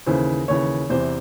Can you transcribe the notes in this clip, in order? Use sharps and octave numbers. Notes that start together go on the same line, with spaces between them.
D#2 C#3 E3 C5
D#2 C#3 E3 C#5
E2 C3 E3 C5